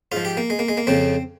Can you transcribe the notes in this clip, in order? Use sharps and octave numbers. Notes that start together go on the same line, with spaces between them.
G#2 F3 F4
G4
A#3
G#3
A#3
G#3
A#3
F2 C#3 F3 C4